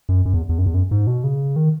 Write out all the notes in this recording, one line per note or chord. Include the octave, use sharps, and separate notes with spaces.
F#2
F#2
E2
E2
F#2
E2
F#2
G#2
B2
C#3
D#3